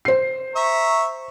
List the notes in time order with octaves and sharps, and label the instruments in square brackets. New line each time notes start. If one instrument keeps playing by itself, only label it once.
[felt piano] C5 C7
[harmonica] E5 A#5 C#6